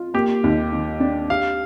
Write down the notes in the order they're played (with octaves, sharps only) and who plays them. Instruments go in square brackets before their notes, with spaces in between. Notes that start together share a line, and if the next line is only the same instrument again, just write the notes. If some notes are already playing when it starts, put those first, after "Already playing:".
Already playing: [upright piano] F4
[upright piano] A#3 [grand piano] G4
[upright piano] D#2
D#3
D4
[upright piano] G4 [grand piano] F5